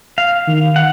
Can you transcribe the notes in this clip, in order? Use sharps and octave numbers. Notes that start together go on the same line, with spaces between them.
F5
D#3
F#5